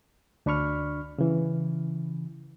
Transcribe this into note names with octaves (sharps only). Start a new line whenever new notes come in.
D2 D4 B5 C#6 F6
C#3 E3